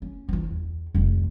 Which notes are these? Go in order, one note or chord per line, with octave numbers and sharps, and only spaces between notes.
C#4
E3 F3
E2
F1 D#3